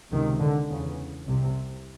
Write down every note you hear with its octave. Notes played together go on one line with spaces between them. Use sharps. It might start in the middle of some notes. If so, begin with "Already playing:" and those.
C#2 C3 D#3
D3
E2 C#3
C2 C3